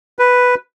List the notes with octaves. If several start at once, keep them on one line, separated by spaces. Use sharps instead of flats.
B4